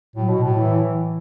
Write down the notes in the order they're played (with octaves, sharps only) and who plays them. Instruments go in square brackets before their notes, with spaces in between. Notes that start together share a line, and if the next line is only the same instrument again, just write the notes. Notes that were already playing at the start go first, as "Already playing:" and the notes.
[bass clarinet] A2 [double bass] F#3
[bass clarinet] B2
A2
[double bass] E3